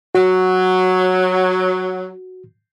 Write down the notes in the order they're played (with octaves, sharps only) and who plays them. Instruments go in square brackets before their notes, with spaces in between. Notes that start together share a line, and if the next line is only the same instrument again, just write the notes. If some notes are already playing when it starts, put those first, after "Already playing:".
[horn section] F#3 [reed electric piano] F#4